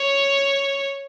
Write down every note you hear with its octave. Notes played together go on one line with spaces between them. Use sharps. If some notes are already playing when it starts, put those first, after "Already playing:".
Already playing: C#5